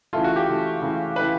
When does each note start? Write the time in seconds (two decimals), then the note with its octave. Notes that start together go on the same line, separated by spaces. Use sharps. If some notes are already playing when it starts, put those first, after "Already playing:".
0.13 C#3 E3 A3 F4
0.24 F#4
0.36 G4
0.48 C#3 E3 A3
0.82 C#3 E3 A3
1.16 C#3 E3 A3 B4